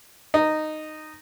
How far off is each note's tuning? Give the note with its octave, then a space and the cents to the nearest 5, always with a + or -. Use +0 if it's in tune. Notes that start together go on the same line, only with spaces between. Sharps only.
D#4 -10